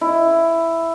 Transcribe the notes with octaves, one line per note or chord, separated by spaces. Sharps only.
E4